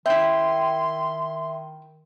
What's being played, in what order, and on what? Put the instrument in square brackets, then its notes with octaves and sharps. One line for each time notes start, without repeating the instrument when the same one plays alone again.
[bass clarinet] D#3 [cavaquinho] E4 G5 [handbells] E5 [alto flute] C6